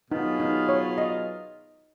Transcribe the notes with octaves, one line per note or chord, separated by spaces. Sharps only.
B2 F#3 B3 D#4 F4 G#4
D#4
C#5
D#5